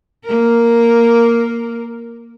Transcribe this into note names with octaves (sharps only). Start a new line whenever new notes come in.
A#3 A#4